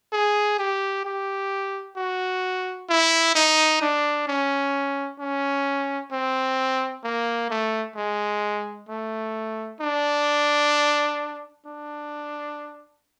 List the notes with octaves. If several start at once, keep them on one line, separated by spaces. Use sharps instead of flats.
G#4
G4
G4
F#4
E4
D#4
D4
C#4
C#4
C4
A#3
A3
G#3
A3
D4
D4